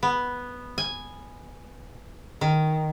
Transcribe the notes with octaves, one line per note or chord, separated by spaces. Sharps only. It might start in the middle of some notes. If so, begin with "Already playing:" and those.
B3
G#5
D#3